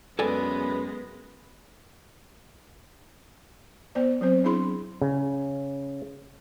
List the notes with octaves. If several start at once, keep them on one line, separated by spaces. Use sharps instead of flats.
F#2 G#3 B3 A4 B4 D5 G#5
B3 C5 D5
F#3 C4 C5
D4 E4 G#4 B5 C6
C#3